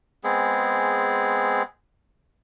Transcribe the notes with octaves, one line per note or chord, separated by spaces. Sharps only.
G#3 B3 C4 G#4